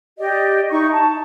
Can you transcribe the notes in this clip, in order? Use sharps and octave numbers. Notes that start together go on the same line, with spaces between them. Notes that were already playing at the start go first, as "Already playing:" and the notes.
G4 D5 D#5
D#4 E4 C#6
A5